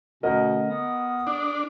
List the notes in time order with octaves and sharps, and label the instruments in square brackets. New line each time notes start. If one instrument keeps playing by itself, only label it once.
[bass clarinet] B2 [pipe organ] D3 A3 C#4 [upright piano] A#4 D#5 F#5
[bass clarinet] B3 [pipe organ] D#6
[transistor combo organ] D4